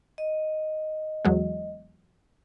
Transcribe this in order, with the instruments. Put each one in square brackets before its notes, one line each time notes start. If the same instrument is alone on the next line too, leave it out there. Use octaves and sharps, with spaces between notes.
[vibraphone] D#5
[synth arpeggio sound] E2 F#3 G#3